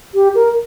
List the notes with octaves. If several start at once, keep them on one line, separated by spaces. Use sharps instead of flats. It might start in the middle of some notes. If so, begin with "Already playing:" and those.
G4
A#4